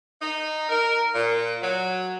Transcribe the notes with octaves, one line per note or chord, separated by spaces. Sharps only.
D#4
A#4
A#2
F#3